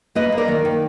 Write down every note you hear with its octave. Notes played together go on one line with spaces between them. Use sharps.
A#3 B4 D#5
A#3
A#4 D5
D#3
D#3